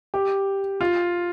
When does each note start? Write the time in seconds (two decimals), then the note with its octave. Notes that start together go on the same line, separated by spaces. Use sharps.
0.14 G4
0.81 F4